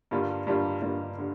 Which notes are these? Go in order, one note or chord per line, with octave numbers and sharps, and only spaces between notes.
G2 D3 G3 A#3 F4
G2 D3 G3 A#3 F4
G2 D3 G3 A#3 F4
D3 G3